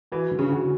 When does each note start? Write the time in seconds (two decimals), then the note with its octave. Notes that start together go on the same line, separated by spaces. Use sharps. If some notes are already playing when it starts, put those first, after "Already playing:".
0.12 E3 F#4
0.31 D3
0.39 C#3
0.52 F#4